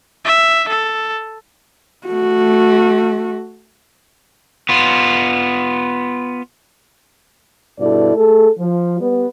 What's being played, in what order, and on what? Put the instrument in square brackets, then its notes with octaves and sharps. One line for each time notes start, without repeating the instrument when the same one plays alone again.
[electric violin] E5
A4
[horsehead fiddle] A3 F#4
[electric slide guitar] B3 F4
[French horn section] G2 B2 E4 A4 D5
A3 G#4 A4
F3
G3 B3